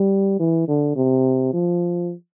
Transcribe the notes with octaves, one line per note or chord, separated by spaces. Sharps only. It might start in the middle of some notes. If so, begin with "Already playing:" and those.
Already playing: G3
E3
D3
C3
F3